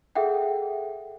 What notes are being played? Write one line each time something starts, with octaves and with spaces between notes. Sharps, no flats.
G#4 A4 E5 F#5 G5